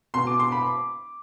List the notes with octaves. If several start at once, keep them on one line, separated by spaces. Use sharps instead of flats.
B2 C6
D6
C6
B5